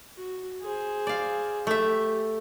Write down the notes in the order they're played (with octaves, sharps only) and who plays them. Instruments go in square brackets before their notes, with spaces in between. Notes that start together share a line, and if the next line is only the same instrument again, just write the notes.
[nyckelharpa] F#4
G#4 C5
[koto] D5 F5
[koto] A3 E5 [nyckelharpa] G4